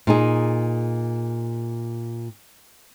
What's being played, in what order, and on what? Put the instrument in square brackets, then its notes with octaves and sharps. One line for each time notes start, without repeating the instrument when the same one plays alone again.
[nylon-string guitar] A#2 D#4 G#4